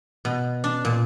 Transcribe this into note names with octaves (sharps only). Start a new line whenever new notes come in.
B2
D4
A#2